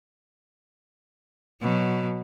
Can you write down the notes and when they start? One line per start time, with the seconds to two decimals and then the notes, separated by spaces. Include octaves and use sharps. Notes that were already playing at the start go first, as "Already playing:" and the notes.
1.61 B2 F#3